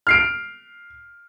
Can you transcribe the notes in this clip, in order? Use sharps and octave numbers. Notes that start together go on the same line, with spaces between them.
F6 C7 D7